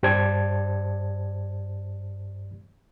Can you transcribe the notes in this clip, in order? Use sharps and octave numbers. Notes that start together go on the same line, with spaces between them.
G2 G4 C5 D5 A5 G#6